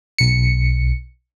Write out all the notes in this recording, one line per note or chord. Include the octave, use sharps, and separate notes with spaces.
B1 C#7